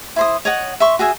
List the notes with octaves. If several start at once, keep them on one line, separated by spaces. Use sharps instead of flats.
E4 C5 D#6
C#5 D#5 F#5
E5 C6 C#6
F#4 G#4 E5 G#5